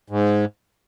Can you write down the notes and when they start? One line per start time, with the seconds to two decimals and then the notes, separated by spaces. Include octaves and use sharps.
0.10 G#2